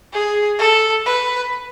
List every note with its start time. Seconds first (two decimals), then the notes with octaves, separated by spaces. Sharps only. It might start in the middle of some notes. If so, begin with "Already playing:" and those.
0.13 G#4
0.59 A4
1.06 B4